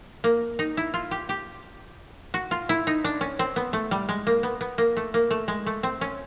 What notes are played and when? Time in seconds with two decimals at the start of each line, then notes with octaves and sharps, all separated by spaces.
0.24 A#3
0.59 D#4
0.77 E4
0.94 F4
1.11 G4
1.29 G4
2.34 F#4
2.51 F4
2.69 E4
2.87 D#4
3.04 D4
3.21 C#4
3.39 C4
3.56 B3
3.73 A3
3.91 G3
4.09 G#3
4.27 A#3
4.43 B3
4.61 B3
4.78 A#3
4.97 A3
5.14 A#3
5.31 A3
5.48 G#3
5.66 A3
5.83 C4
6.01 C#4